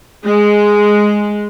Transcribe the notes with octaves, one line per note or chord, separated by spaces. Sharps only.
G#3